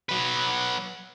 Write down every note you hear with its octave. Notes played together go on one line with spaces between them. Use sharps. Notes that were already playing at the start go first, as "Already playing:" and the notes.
F#3 B4